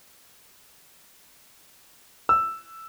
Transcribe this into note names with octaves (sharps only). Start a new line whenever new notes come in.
E6